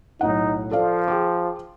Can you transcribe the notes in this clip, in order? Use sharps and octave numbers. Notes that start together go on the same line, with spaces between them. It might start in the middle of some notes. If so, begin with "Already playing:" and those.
B1 A2 D#4 F#5
F3 A4 D5 F5
G#4 G5 D6